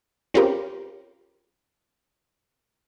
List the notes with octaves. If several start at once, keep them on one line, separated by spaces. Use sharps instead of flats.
C4 C#4 F4 G4 A#4